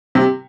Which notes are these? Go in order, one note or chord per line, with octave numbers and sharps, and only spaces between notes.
C3